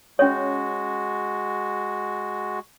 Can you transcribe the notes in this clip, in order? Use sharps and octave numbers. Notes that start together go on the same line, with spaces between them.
G#3 C#4 F#4 C#5